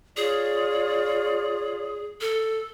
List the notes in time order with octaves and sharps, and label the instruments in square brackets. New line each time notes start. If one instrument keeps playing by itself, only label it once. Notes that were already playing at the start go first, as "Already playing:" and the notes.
[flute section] F4 C#5 D5 [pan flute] G#4
[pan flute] A4